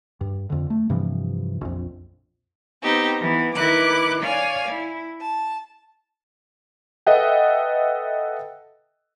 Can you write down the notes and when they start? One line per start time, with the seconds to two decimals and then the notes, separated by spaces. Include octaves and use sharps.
0.21 G2
0.50 F2 D3
0.70 A3
0.90 G2 C3 E3 F3
1.61 A#1 F2
2.83 B3 C4 D#4 G4
3.21 E3 B3
3.55 D#3 E4 B4 D6 F#6
4.22 C#5 D5 F5 G#5
4.70 E4
5.20 A5
7.06 A4 B4 D#5 E5 F#5 G5